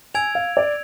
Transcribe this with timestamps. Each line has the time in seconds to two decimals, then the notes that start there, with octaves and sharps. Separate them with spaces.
0.14 G#5 E6 G#6 D7 F7
0.35 F5
0.57 D5